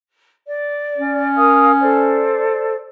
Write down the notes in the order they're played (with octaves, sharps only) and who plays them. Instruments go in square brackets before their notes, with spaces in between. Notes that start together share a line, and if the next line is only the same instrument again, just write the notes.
[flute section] D5
[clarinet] C#4
[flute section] A#4 F5 D#6
A4 C5 D5